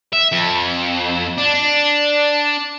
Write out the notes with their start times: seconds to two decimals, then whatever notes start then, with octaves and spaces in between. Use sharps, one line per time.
0.13 E5
0.32 F2
1.38 D4